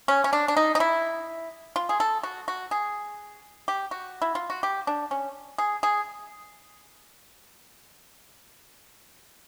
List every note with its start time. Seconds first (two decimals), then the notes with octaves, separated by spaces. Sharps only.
0.08 C#4
0.24 C#4
0.33 D4
0.48 D4
0.57 D#4
0.75 D#4
0.80 E4
1.76 F4
1.89 G#4
2.00 A4
2.23 F#4
2.48 F#4
2.71 G#4
3.68 G4
3.91 F#4
4.22 E4
4.35 F4
4.50 F#4
4.63 G4
4.87 D4
5.11 C#4
5.58 G#4
5.83 G#4